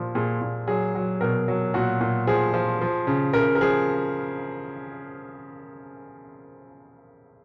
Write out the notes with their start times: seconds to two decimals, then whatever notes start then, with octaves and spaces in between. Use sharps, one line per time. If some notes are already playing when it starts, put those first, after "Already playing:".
Already playing: A#2 F3
0.15 A#2 G#4
0.41 A#2
0.68 F#3 G#4
0.95 F#3
1.21 B2 A#4
1.48 F#3
1.74 A#2 F#4
2.01 A#2
2.27 F3 G#4
2.54 F3
2.81 F3
3.07 C#3
3.33 C#3 A#4
3.55 A#4
3.61 F3 G#4